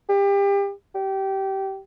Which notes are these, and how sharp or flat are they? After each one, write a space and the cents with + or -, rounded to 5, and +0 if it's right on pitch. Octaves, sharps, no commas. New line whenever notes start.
G4 +30
G4 -20